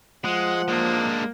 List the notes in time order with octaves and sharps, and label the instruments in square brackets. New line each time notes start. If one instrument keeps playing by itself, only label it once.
[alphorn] F3 [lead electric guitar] G#3 [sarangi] F#5
[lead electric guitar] G#3 D4 [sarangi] A#3